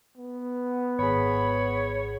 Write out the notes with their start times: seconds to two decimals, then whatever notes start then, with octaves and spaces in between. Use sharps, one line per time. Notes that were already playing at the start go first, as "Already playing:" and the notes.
0.17 B3
0.99 G#1 G#4 C#5 B5